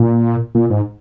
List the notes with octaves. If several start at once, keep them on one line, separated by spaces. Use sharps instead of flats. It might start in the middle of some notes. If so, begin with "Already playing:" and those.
Already playing: A#2
A#2
G#2